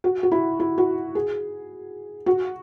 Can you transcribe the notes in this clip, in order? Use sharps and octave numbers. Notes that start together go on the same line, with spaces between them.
F#4
F#4
E4
E4
F#4
G#4
F#4